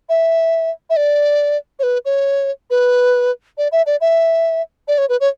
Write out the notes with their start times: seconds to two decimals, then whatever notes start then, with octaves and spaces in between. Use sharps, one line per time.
0.09 E5
0.90 E5
0.96 D5
1.79 C#5
1.83 B4
2.05 C#5
2.70 B4
3.58 D5
3.72 E5
3.86 D5
4.01 E5
4.88 D5
4.98 C#5
5.09 B4
5.20 C#5